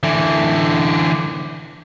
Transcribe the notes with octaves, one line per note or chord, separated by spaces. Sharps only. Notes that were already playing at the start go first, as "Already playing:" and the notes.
D3 E3